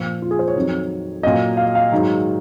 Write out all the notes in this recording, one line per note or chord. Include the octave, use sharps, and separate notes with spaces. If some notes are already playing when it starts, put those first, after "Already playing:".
Already playing: A#2 F3
F4
G#4
C5
C#5
F2 D#3 F#3
A#2 F#3 D#5
F5
F5
G#2 D#3 F#3